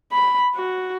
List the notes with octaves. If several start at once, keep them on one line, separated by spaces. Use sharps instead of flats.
B5
F#4